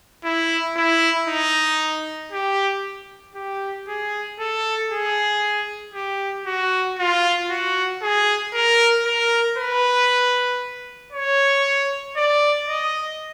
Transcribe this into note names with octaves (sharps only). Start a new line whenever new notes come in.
E4
E4
D#4
G4
G4
G#4
A4
G#4
G4
F#4
F4
F#4
G#4
A#4
A#4
B4
C#5
D5
D#5